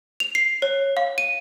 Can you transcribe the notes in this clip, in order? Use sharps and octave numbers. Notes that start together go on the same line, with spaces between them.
F7
C7
C#5
F5
D#7